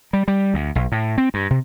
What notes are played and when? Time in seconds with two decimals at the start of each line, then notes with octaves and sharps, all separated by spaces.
0.13 G3
0.28 G3
0.54 D2
0.75 B1
0.92 A2
1.18 C4
1.34 G2
1.50 C3